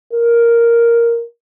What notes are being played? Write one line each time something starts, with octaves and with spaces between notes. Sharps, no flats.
A#4